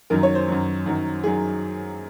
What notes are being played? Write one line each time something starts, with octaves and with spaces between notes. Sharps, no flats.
F#2 D#3 F#3 A#4
C#5
C5
F#2 D#3 F#3
F#2 D#3 F#3
D#3 F#3 G#4